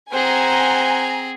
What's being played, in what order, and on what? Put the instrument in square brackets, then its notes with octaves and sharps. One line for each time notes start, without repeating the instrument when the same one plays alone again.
[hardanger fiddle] C4 G#4 [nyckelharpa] C5 F#5 [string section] G#5 A#5